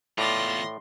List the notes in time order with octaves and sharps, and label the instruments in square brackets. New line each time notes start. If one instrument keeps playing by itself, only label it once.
[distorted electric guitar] E2 F4 [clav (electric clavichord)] A2 D5 [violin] C6 A#6